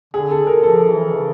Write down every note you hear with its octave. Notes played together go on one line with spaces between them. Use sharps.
D3 G#4
A4
A#4
F3 A4
E3
C#3